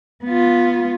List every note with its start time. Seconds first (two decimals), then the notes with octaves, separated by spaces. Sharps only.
0.25 B3 F4